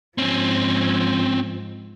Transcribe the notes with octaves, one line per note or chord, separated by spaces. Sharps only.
G#2 F3 C4 C#4